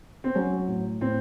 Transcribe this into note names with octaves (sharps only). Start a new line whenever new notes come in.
C4
F#3 C#4
A2
A2 C4